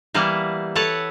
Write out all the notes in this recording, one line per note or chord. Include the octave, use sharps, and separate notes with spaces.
E3 G3 A#3 B3 E4
A4 B4 C#5 F#5 A5